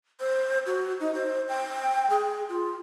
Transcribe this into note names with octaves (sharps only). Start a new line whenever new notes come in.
C5
F#4
D#4
C5
G5
G#4
F4